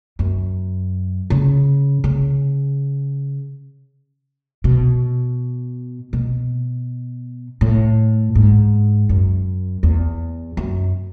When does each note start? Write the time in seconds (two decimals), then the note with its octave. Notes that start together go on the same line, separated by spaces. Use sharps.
0.19 F#2
1.30 C#3
2.04 C#3
4.64 B2
6.13 B2
7.61 A2
8.35 G#2
9.09 F#2
9.83 E2
10.57 F#2